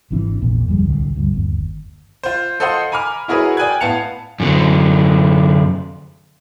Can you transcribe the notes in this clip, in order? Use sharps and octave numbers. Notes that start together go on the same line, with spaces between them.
G#1 C3 E3 D4
A#1 E2 A#2
G1 F2 G3 G#3
D1 C2 D3
D2 G2
G1 D#2
F4 C5
A4 C5 D#5 F5 F#5 C6
G#5 A#5 B5 D6 F6
E4 F#4 G#4 A#4 B4 C#5
D5 G5 G#5 D#6 F#6 G#6
A2 B3 F5 A5 C#7 F7
F#2 D3